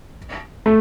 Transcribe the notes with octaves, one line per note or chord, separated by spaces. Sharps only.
A3